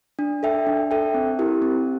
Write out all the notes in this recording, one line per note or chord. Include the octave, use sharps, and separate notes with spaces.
D4
A4 E5 G5
D4
A4 E5 G5
C4
E4 G4 A#4
C4